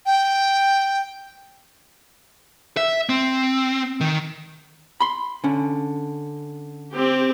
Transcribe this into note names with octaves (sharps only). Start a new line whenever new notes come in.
G5
E5
C4
D#3
B5 C6
D3 C#4
C4 G4